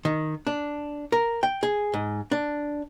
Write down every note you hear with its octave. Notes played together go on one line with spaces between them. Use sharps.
D#3
D4
A#4
G5
G#4
G#2
D4